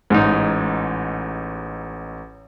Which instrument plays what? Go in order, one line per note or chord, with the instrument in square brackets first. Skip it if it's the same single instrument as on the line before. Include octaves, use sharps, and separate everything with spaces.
[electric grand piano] A1 [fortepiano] G#2 D#4